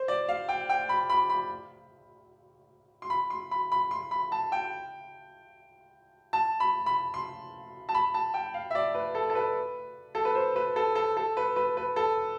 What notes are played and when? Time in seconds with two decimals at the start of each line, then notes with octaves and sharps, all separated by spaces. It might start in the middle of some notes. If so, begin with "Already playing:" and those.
Already playing: C5
0.08 D5
0.29 F5
0.49 G5
0.70 G5
0.89 B5
1.10 B5
1.30 B5
3.02 C6
3.10 B5
3.30 C6
3.51 B5
3.72 B5
3.91 C6
4.11 B5
4.32 A5
4.52 G5
6.33 A5
6.60 B5
6.86 B5
7.14 C6
7.89 A5
7.95 B5
8.14 A5
8.34 G5
8.54 F5
8.71 E5
8.75 D5
8.94 B4
9.15 A4
9.30 A4
9.35 B4
10.15 A4
10.25 B4
10.35 C5
10.56 B4
10.76 A4
10.95 A4
11.17 A4
11.37 B4
11.56 B4
11.77 B4
11.96 A4